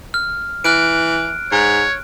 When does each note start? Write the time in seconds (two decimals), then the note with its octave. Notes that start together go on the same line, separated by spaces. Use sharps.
0.14 F6
0.64 E3 F6 F#6 D7
1.52 G#2 C#5